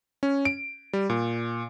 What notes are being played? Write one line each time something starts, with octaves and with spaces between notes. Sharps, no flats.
C#4
D7
G3
A#2